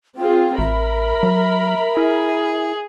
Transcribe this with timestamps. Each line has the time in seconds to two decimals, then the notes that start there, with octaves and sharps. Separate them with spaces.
0.17 C4 F4 G#4 G5
0.58 A1 A#4 E5 B5
1.23 F#3
1.97 E4 G#4